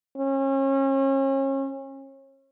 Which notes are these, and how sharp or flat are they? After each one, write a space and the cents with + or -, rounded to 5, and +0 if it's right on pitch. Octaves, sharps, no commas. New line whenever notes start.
C#4 -35